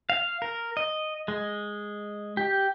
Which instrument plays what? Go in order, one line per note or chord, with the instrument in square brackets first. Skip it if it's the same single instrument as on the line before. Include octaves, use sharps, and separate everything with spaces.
[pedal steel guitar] F5
A#4
D#5
G#3
G4